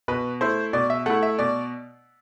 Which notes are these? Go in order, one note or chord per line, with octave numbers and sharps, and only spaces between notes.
B2 B4
A3 E4 C5
B2 D5
E5
A3 E4 F#5
E5
B2 D5